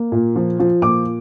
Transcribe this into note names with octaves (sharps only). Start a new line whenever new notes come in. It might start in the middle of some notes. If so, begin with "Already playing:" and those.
Already playing: A#3
A#2
F3
F3
A#2 D6